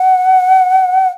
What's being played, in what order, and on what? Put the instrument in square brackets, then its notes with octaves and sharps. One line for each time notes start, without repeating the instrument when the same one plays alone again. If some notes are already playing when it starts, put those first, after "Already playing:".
Already playing: [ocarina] F#5